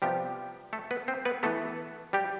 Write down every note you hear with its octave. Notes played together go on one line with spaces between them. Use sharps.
C3 F3 G3 B3 G4
A3 A4
B3 B4
C4 C5
B3 B4
E3 A3 B3 A4
G3 G4